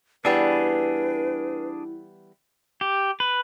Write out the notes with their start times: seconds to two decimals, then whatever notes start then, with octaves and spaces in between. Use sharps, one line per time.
0.25 E3 G3 B3 D4 E4 G#4 B4
2.81 G4
3.20 B4